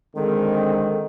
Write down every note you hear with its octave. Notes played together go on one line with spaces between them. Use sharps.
D3 D#3 G#3 C4 A4